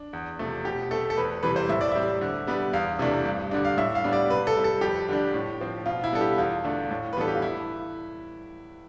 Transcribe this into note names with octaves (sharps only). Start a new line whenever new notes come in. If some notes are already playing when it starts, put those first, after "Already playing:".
Already playing: D4
E2
C3 F3 A3
B2 G4
A3 C4 A4
A4
E2 B4
C3 E3 G3 B4
C5
A2 E5
D5
G3 C4 E5
D3
G3 B3 D4
E2 F5
C3 E3 A3 D4
G2
D3 G3 D4
F5
A2 E5
F5
G3 B3 D4
D5
C3 B4
A4
G3 C4
A4
F2 G4
D3 G3 D4
A2
F3 C4
B2 F4
E4
G3 B3 D4 A4
G4
E2 F4
D3 A3 D4
A2
B4
E3 G3 B3 D4 A4
G4
F4
E4